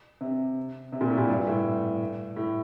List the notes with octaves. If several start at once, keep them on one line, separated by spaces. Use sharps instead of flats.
C3
C3
A#2
A2
A#2
G2
A2
A2